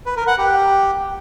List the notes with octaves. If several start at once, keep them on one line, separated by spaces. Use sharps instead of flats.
B4
A#4
F#5
G4